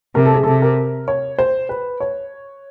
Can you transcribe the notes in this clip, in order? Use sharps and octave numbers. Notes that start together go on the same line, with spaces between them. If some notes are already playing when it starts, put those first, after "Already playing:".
C3 A#4
A4
G#4
C3 A4
A#4
C#5
C5
B4
C#5